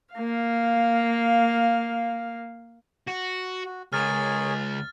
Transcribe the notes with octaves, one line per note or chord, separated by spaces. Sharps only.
A#3 F5
F#4
F#4
C#2 G#4 A#4 C#5 F6 A6